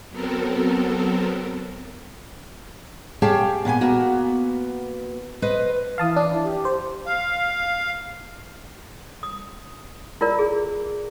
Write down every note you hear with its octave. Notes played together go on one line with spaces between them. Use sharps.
F#3 B3 C4 A4 A#4
G4 G#4 C#5 F5 G5 A5
A#2 B3 C#5 G#5
A#3 B3 F#4
B4 C5 D#5
E3 F5 A5 D#6
D4
G4
C5
F5
D#6
E4 F4 A#4 D5
G#4